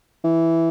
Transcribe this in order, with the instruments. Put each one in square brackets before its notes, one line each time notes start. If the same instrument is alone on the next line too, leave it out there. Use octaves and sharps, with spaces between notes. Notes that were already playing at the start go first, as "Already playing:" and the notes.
[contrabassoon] E3